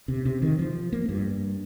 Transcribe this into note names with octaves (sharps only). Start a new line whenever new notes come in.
C3
C3
D#3
F3
A#3
G2